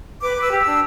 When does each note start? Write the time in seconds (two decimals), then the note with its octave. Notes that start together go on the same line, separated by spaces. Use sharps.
0.22 B4 D6
0.36 B4
0.41 E6
0.51 G4
0.60 E6
0.66 D4